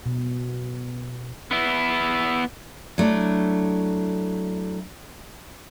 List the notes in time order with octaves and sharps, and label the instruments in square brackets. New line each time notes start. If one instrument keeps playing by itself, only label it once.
[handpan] B2
[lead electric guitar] B3 E4
[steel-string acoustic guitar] F#3 A3 D4 E4